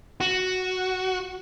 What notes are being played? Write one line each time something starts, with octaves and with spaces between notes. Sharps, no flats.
F#4